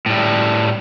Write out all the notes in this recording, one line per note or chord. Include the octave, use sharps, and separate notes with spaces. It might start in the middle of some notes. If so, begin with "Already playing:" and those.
A2 G3